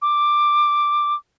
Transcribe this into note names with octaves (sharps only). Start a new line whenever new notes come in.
D6